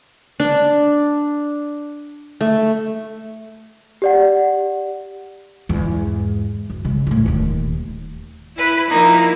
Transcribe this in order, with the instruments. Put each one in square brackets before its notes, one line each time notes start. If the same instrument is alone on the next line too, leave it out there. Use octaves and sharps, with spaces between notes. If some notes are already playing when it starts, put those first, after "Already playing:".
[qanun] D4
A3
[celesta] G4 D5 F#5
[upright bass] E2 G#2
F#2
C#3 G#3
A2 E3
D#1 D#2
[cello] E4 B4
[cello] F3 E4 [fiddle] A#3 D#4